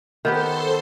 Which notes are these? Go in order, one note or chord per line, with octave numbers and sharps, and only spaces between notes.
D#3 B3 G4 A4 C5 C6